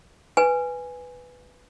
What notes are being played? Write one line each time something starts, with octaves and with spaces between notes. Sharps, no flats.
B4 G#5